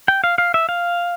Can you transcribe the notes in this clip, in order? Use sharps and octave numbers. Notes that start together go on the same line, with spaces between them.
G5
F5
F5
E5
F5